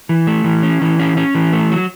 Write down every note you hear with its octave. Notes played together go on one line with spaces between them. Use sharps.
E3
A3
E3
C#4
E3
C#4
C#4
E3
A3
F#3